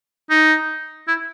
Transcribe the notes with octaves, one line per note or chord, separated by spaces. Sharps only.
D#4
E4